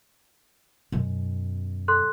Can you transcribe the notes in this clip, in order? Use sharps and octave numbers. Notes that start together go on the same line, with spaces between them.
F#2 B2
A4 C6 F#6